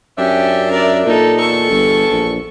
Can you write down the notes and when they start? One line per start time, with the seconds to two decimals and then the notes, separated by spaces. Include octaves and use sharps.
0.18 F#2 C#4 D4 G4 E5
0.71 A#4 D5
1.06 A#2 D#4 A4
1.40 E2 A4 C#6
1.70 G1
2.11 A#1